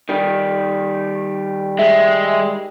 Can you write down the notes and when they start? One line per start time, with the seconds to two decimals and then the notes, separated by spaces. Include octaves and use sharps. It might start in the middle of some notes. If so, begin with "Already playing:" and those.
0.09 D#3 G3
1.79 G#3 E5